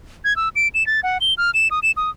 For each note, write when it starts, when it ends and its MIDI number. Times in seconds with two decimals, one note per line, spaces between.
0.25 0.36 92
0.36 0.49 88
0.56 0.68 98
0.74 0.86 100
0.87 1.00 93
1.03 1.18 78
1.21 1.34 103
1.38 1.51 89
1.54 1.68 100
1.71 1.80 87
1.83 1.91 100
1.97 2.10 87